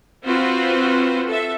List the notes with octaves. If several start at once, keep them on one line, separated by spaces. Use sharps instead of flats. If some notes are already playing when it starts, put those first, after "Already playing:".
C4 F4 F#4 B4 C5
A4 E5